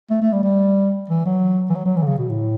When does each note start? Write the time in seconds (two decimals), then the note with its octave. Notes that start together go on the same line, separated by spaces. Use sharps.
0.10 A3
0.22 A3
0.33 G3
0.43 G3
1.10 E3
1.26 F#3
1.70 E3
1.75 F#3
1.86 F#3
1.96 E3
2.03 D3
2.07 C#3
2.18 B2
2.29 A2